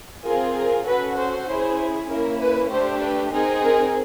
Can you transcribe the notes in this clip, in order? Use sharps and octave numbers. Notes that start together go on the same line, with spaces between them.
C4 F4 G#4 A#4
A#4
C#4 F#4 A4 B4
C5
C#4 E4 G#4
A#3 C#4 E4 A#4
B4
A3 D4 G4 C5
B4
C4 D#4 G#4 A#4
A#4